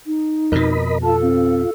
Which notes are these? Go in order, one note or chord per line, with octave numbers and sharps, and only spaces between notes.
D#4
F2 B2 A#4 D#5 B5
F4 A4 A5
C4